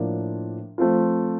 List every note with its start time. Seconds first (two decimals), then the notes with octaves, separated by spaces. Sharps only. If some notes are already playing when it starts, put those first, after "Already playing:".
Already playing: A2 F3 A#3 D4
0.78 F3 A3 C4 F4